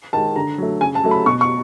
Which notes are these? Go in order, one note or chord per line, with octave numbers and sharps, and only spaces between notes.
D#3 G#3 A5
D3 A#5
F#3 A3
C#3 G#5
A5
F#3 A3
B5
B2 C#6
C#6